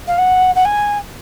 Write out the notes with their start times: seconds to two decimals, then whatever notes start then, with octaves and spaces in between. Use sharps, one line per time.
0.07 F5
0.17 F#5
0.55 F#5
0.64 G#5